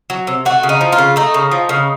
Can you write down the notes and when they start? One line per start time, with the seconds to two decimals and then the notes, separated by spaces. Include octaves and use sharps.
0.10 F#3
0.27 C3
0.45 A3 F#4
0.63 C#3
0.69 D#4
0.81 F3
0.92 F4
0.98 C#3
1.16 A3 D#4
1.34 C#3
1.52 F3
1.69 C#3